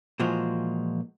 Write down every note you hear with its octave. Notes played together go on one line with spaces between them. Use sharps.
A#2 E3 F3 G#3 F4 F#4